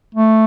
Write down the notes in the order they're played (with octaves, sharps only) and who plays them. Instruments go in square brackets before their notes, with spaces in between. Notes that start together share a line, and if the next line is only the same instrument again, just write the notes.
[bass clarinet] A3